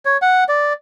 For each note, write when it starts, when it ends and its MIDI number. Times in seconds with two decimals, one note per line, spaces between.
0.05 0.17 73
0.22 0.44 78
0.49 0.73 74